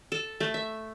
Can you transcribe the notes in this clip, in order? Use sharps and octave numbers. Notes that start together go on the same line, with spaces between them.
A4
A3
E5